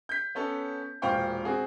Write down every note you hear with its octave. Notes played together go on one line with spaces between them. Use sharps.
G6 B6
B3 C#4 A4
E1 A#2 C5 F5 G5 C#6
C4 F#4 G#4